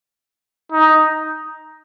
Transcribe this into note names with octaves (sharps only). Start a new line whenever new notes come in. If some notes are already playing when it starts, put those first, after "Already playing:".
D#4